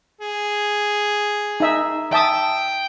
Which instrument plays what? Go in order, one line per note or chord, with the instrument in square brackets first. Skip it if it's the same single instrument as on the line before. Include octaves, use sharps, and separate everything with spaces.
[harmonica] G#4
[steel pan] D#4 E5
[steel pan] E5 A5 D#6 [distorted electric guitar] G5